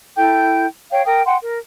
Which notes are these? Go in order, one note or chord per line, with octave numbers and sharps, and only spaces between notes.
E4 A4 G5 G6
C#5 F5 G5
A#4 G5 D#6
F#5 G5 C6
A#4